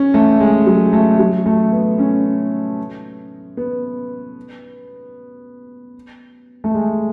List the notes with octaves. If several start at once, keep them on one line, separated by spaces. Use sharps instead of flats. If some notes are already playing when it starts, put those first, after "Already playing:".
Already playing: C#4
A3
G#3
F#3
A3
F#3
A3
B3
C#4
B3
A3
G#3